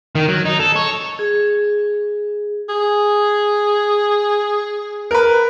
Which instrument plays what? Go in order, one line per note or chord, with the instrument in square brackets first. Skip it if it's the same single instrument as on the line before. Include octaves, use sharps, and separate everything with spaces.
[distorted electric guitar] D#3
F#3
D#4
A4
C#5
[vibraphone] G#4
[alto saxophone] G#4
[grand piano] A#4 B4